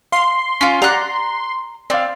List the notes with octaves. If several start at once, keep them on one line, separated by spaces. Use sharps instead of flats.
F5 C6
C#4 F4
G4 D5 F#5 A#5 F#6
C4 D5 F5